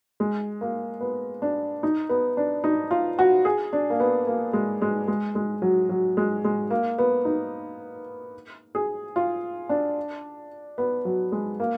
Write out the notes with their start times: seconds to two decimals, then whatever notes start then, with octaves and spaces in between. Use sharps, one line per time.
0.20 G#3
0.61 A#3
1.01 B3
1.42 D4
1.83 D#4
2.09 B3
2.37 D4
2.64 D#4
2.91 F4
3.19 F#4
3.45 G#4
3.73 D4
3.90 A#3
4.00 B3
4.27 A#3
4.53 G#3
4.82 G#3
5.08 G#3
5.35 G#3
5.62 F#3
5.89 F#3
6.17 G#3
6.44 G#3
6.70 A#3
6.98 B3
7.25 D#4
8.75 G#4
9.16 F4
9.69 D4
10.78 B3
11.05 F#3
11.32 G#3
11.60 A#3